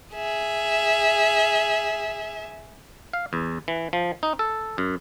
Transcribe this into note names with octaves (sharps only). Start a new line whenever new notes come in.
G#4 E5
F5
E2
E3
F3
D#4
A4
F#2